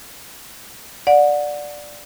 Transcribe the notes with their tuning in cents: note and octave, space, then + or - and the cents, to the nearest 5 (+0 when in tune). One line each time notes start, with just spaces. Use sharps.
D5 +0 F#5 -25